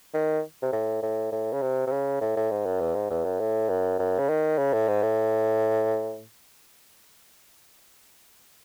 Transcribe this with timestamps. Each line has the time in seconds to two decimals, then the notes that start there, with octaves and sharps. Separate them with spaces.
0.14 D#3
0.63 C3
0.73 A2
1.03 A2
1.32 A2
1.53 C#3
1.62 C3
1.87 C3
1.92 C#3
2.21 A2
2.36 A2
2.51 G#2
2.66 F#2
2.80 E2
2.95 G#2
3.10 E2
3.25 F#2
3.40 A2
3.69 F#2
3.99 F#2
4.19 C#3
4.29 D#3
4.58 C#3
4.73 A2
4.88 G#2
5.02 A2